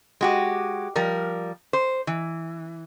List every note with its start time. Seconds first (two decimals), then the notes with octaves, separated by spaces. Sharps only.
0.21 G#3 F#4 G4
0.96 F3 G3 A#4
1.73 C5
2.07 E3